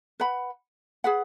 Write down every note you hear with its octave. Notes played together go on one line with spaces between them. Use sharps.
B4 F#5 B5
G#4 B4 F#5